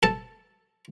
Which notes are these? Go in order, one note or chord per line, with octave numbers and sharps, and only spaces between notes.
A4 A5